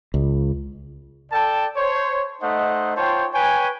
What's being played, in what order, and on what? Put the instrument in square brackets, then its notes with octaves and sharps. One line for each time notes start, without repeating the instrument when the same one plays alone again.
[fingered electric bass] C#2
[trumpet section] A4 D5 G5 A5
C5 C#5
A3 D#4 C5 D#5 F#5
F4 C5 C#5 G5 A5
B4 C#5 G5 G#5